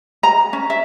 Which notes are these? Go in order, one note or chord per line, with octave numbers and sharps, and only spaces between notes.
A#5
C#4
E5